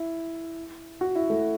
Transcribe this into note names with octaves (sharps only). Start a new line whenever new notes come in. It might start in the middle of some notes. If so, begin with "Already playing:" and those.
Already playing: E4
F#4
E4
A3